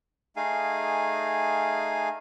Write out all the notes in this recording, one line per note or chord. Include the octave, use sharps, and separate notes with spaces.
A3 D#4 G#4 F5 G#5